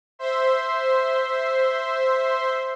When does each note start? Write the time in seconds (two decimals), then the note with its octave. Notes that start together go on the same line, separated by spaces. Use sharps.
0.19 C5 E5 C6